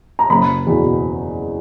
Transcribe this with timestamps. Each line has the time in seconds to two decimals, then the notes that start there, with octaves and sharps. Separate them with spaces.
0.19 A#5
0.30 F#1 B5
0.67 E2 B2